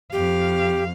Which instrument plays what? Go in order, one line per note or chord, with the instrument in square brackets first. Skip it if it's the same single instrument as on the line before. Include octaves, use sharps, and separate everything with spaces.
[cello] F2 F5 [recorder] G4